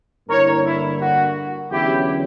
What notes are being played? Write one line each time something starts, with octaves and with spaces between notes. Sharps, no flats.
G2 D3 A#3 E4 A#4 C#5
E4
F#4
E2 D3 F#3 C#4 E4 G4